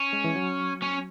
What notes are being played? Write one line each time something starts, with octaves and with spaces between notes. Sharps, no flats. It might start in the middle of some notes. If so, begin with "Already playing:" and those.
Already playing: C#4
G#3
E3
F#3
C#4